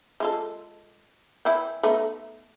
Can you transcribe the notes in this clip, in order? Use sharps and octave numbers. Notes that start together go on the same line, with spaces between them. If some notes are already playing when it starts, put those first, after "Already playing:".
G#3 F4 A4
E3 E4 G5
A3 B3 D#4